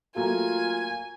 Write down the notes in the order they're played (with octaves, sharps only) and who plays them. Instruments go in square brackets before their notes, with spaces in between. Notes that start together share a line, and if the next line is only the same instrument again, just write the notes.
[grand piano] F#3 A3 A#3 [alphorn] F4 [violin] G#5